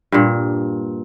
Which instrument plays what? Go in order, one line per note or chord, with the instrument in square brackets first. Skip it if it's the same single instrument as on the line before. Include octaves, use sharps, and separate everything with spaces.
[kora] G2 A#2